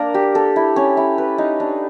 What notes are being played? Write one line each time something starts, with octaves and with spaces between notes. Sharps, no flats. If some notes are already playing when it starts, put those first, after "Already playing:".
Already playing: A#3 D4 A#4
G4
A4
E4
C#4
E4
B4
D#4
D4